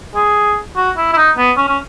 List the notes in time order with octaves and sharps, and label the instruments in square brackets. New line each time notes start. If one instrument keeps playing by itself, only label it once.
[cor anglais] G#4
F#4
E4
E4
D#4
B3
C#4
C#4